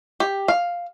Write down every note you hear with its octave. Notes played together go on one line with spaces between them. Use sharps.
G4
F5